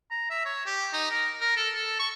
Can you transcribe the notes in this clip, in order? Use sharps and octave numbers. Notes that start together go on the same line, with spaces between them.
A#5
E5
C#5
G4
D#4
A#4
A#4
A4
A4
C#6